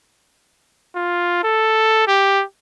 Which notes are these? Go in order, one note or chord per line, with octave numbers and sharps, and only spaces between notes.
F4
A4
G4